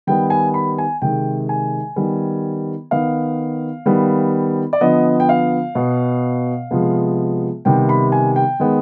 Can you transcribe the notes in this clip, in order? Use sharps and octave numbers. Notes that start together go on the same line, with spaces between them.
D#3 G3 B3 G5
G#5
B5
G#5
C3 D#3 G#3 G5
G#5
D#3 G3 B3
D#3 B3 F5
D#3 G3 B3
D5
D3 F3 B3 D#5
G5
F5
B2 B3
C3 F3 G#3 B3
C3 D#3 G3 B3 G5
B5
G#5
G5
D#3 G#3 B3